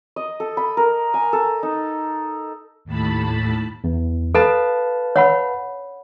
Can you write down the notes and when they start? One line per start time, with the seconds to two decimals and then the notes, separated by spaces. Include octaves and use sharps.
0.16 D#5
0.40 A4
0.57 B5
0.77 A#4
1.14 G#5
1.33 A4
1.63 D#4
2.85 D#2 A2 A5 B5
3.84 E2
4.35 A4 B4 F5 A5
5.16 C#5 F#5 B5